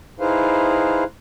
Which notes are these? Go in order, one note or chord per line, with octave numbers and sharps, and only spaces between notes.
D#4 E4 G#4 B4 C5 F5